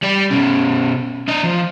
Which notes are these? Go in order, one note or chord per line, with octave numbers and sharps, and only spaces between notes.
G3 D5
B2 C#4
D4 D#5
F3